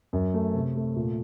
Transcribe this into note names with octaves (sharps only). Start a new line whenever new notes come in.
F#2
A3
C3
A3
A#2